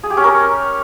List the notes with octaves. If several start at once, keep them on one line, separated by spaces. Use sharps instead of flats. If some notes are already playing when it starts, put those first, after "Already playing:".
G#4
G4
C#4
A#4